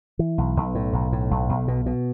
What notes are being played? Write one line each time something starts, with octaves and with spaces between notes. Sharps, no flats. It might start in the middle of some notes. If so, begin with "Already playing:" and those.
E3
B1
B1
A2
B1
A2
B1
B1
B2
B2